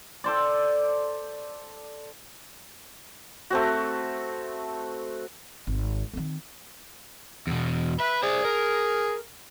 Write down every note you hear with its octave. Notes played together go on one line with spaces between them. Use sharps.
A4 C5 D5
A3 C4 F#4
G#1
D#3 C4
E2 B2
B4 E5
G#4 C5 D5
A#4